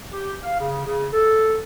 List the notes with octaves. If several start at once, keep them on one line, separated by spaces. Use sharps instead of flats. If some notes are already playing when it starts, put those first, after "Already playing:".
G4
F5
C#3
C#3
A4